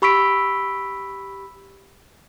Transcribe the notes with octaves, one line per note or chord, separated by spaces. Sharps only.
G4 B5 C#6 E6 B6 D7